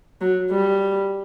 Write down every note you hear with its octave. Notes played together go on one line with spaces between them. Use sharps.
F#3
G3